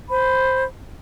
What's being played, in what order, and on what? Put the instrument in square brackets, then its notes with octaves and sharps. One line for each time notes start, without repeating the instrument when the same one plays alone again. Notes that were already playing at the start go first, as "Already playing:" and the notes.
[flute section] C5 B5